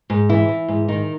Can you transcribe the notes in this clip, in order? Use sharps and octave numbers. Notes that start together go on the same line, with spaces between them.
G#2
E3 E4
E3
G#2
D#3 D#4